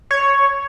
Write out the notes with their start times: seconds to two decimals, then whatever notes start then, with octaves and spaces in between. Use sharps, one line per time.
0.11 C#5